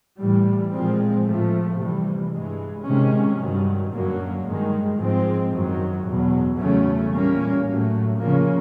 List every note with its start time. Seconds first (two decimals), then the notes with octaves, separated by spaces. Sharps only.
0.18 A2 E3 G3
0.72 A#2 F3 G#3 C4
1.26 A2 F3 A3
1.78 C3 E3 G3
2.31 G2 E3 G#3
2.85 C3 D#3 G#3 C#4
3.38 G2 D#3 F#3
3.92 F#2 D3 F#3 A#3
4.44 G2 D#3 G#3
4.99 G#2 F3 G#3 C4
5.52 F#2 D#3 F#3
6.05 E2 B2 F#3
6.58 E2 C#3 F#3 A3 C#4
7.12 A#2 G3 A#3 C#4
7.65 A2 F#3 A3
8.18 C#3 F3 A#3 C#4